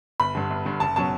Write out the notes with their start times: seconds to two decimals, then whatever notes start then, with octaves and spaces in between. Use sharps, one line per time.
0.20 G1 B5
0.35 G2 D3
0.50 G1
0.65 G2 D3
0.80 F#1 A5
0.96 B2 F#3 C#4 A5